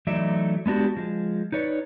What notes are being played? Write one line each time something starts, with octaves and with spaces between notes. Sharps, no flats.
E3 F#3 A3 D#4 D5 E5
G#3 B3 D4 F#4 G4
F3 G#3
D#4 B4 C#5 D5